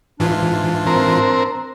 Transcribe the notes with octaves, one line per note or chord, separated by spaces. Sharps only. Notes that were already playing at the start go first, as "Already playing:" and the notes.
G#2 E3 D4 F4
C4 A#4